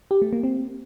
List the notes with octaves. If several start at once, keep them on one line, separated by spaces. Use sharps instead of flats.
G4
A3
A#3
C4